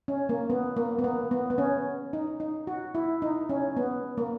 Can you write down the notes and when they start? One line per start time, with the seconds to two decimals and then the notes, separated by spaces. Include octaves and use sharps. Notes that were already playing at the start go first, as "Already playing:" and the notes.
0.08 C#4
0.29 A#3
0.50 B3
0.77 A#3
0.99 B3
1.04 A#3
1.31 B3
1.50 B3
1.58 C#4
2.13 D#4
2.40 D#4
2.67 F#4
2.95 E4
3.22 D#4
3.49 C#4
3.77 B3
4.18 A#3